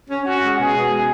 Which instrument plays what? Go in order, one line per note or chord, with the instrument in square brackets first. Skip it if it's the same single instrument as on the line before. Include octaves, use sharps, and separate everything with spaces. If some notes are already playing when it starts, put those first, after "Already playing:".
[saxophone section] C#4
[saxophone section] C#4 [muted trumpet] F#4
[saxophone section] G#3
[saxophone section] B2 [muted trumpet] G#4
[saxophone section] B2
G#3